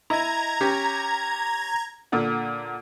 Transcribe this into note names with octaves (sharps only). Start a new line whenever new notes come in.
E4 D#5 A#5 G#6
C#4 G4
A#2 D3 F#5